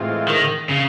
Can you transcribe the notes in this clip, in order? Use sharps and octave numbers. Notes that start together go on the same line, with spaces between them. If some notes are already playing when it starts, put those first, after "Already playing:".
Already playing: A2 E3 G#3 C4 F4
D#3
C#3